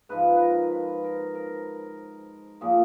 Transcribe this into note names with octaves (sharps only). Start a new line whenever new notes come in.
G#2 F3 B4
A#4 B4
B4
A#4
A#4
A#2 F3 G#4